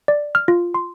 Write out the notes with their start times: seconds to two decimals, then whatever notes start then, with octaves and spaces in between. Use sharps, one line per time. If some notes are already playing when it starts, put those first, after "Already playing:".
0.08 D5
0.35 F6
0.48 F4
0.74 C6